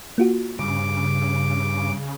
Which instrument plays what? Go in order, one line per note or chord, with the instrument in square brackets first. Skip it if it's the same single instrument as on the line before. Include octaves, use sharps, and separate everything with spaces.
[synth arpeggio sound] A#3 F4 F#4
[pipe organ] G2 D6 [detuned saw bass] C#3